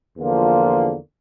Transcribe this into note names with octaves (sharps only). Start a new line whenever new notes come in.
E2 D3 F3 A#3 F4